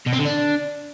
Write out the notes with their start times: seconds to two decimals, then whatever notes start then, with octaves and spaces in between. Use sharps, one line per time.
0.06 B2
0.13 C4
0.19 D3
0.25 D4